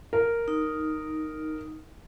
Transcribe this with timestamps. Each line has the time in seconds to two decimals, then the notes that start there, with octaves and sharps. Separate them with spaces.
0.13 A#4
0.48 D#4